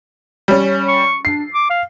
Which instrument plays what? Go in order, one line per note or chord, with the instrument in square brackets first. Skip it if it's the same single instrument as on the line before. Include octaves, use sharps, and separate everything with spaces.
[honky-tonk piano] G3 C#4
[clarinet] C#6
[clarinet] D4 [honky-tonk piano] C7
[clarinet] D6
F5